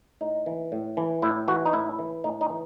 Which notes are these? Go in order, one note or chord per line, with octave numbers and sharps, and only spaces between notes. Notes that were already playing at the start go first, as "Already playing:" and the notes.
A2 D#4
E3
A2
E3
A2 E4
E3 F#4
D#4
A2 E4
E3
A2 D#4
D#4
E3